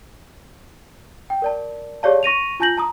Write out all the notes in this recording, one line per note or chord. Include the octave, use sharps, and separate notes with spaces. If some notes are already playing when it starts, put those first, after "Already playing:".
G5
A#4 D5 A5
G4 G#4 C#5 D5 F5 A5
C#6 A#6 D#7 F7
F4 G#5 A5 G6 A#6 F#7
A5 A#5 D#6